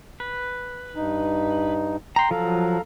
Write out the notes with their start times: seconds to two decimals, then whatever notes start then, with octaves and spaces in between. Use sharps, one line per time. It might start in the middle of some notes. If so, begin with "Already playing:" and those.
0.20 B4
0.96 G2 D#4
2.16 G5 A#5 C6
2.31 F3 F#3 A4 F5 A#5